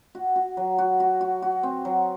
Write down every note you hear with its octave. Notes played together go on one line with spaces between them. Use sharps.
F#4
F#4
F#3
F#4
F#4
F#4
F#4
C4
F#3